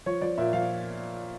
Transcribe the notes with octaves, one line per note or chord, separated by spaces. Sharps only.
F3 C#5
F3 D5
A#2 E5
F3 F5